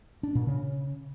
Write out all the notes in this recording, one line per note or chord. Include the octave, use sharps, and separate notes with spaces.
D4
A#2
C#3